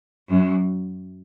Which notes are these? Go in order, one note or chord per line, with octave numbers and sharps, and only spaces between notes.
F#2